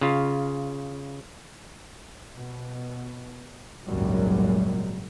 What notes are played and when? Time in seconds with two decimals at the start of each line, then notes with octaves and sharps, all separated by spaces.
0.01 C#3 F4
2.34 B2
3.84 G#1 C#2 F#2 A#2 F#3 G3